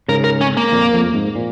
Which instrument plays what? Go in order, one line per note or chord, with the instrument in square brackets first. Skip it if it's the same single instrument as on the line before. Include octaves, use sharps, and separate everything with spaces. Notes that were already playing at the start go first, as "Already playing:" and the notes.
[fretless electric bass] G#2 C#3 [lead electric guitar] A#4
[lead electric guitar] A#4
C#4
A#3
[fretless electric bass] F2 A#2
F2
G#2
A#2